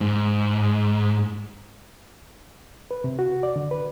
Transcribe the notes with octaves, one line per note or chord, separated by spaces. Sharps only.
G#2
B4
C3
F#4
D5
D3
B4